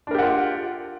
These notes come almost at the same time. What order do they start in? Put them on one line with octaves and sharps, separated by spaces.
D4 A#4 G4 F#5 F4